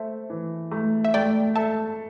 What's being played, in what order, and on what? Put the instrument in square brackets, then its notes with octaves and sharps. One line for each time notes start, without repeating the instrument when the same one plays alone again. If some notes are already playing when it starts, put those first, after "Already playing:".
Already playing: [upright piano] A3 A4 [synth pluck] C5 E5
[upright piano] E3
A3
[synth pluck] E5
[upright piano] A3 [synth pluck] D5 G5
[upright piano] A4 [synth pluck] E5 A5